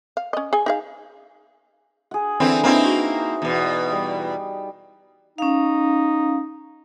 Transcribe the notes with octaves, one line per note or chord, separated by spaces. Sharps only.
F5
C#4 D#5
G#4 G#5
D#4 G#4 F5
G#4 F#5
D3 E3 C4 E4
A#3 C4 D#4 E4
F#4
E2 B2
G3
C#4 D#4 F5